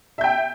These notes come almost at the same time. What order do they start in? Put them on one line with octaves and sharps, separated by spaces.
E5 G6 G5